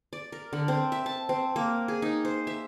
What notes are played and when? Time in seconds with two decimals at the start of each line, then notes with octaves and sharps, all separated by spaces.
0.13 D5
0.32 A#4
0.53 D3
0.68 C4
0.92 E5
1.06 A5
1.29 C4
1.56 A#3
1.88 G#4
2.02 D#4
2.25 C5
2.47 E5